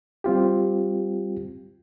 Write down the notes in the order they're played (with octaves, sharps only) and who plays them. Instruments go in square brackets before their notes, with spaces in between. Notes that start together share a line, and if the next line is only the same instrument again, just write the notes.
[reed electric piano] G3 C4 F4 G4